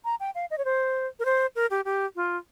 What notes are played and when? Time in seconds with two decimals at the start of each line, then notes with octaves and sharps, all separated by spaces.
0.05 A#5
0.20 G5
0.35 F5
0.51 D#5
0.58 C#5
0.65 C5
1.19 A#4
1.25 C5
1.56 A#4
1.70 G4
1.85 G4
2.16 F4